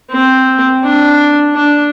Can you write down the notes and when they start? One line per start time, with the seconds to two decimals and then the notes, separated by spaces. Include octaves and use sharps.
0.11 C4
0.83 D4
1.55 D4